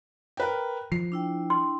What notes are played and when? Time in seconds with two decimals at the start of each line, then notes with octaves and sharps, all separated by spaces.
0.37 A#4 B4 G5
0.92 F3 C7
1.12 D4 E4 G5
1.50 C6